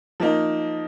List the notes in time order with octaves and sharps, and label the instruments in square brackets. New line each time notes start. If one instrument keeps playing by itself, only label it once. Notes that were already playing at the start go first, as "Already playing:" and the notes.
[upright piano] F3 A#3 D#4